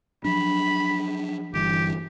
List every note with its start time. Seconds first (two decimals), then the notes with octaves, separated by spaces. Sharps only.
0.25 F3 F#3 D4 B5
1.53 G1 G2 E3 G4